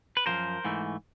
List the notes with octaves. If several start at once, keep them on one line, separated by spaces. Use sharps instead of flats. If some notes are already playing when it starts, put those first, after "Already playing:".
B4
F#2 C#3 F3 A#4 C5
G#2 E3 A3